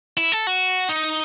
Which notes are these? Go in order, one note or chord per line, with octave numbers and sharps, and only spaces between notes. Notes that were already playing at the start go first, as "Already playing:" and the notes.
E4
A4
F#4
D#4